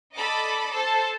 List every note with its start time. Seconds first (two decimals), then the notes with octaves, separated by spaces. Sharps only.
0.15 A4 D5 D#5 B5 D6
0.71 A4 C5 A5